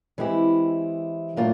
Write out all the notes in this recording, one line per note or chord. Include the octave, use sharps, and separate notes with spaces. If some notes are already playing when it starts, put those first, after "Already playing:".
E3 G#3 C4 E4 G4
A2 F#3 A#3 D4 F4